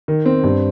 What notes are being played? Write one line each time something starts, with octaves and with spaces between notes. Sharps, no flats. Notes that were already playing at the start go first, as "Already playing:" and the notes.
D#3
C4
G2